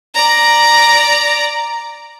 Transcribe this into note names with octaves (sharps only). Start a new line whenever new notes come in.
D5 A#5